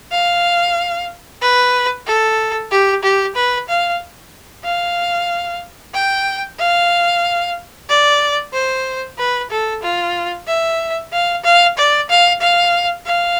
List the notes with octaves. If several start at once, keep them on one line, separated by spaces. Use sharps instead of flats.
F5
B4
A4
G4
G4
B4
F5
F5
G5
F5
D5
C5
B4
A4
F4
E5
F5
F5
D5
F5
F5
F5